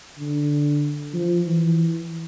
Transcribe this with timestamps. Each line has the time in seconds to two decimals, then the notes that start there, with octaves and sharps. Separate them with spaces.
0.19 D3
1.14 F3
1.46 E3